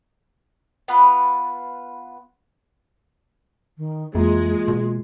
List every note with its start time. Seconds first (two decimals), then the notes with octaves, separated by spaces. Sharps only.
0.88 B3 F4 B4
3.78 D#3
4.15 F2 E3 G#3 A#3 F4
4.68 B2